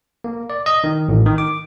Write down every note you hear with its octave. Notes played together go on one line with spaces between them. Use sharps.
A#3
D5
D#5
D#3
A1
D#3
D6